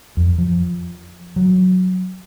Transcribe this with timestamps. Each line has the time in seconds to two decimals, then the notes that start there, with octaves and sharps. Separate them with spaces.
0.17 F2
0.38 F3
1.36 F#3